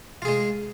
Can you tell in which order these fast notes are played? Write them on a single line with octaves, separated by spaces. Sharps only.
F4 G#4 G#3